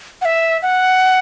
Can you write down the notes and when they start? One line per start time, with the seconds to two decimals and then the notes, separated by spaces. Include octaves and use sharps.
0.22 F#5
0.25 E5
0.62 F#5